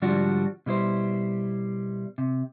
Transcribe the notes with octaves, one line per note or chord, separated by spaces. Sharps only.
G#2 D3 F3 G3 D4 F#4
B2 G3 E4 C5
C3